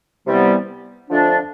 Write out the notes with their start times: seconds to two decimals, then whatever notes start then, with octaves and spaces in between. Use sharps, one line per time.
0.26 C3 E3 G3 B3
1.09 F2 D3 F3 A3 D4